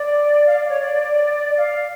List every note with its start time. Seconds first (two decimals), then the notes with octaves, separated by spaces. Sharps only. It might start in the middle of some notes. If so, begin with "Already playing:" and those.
Already playing: D5
0.46 F5
0.58 D5
0.69 C#5
0.80 D5
1.57 F5